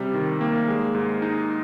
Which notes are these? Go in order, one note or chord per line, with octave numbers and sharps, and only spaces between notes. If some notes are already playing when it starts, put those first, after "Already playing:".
Already playing: C3 G3
D#3
A#3
G#3
G#2
D#4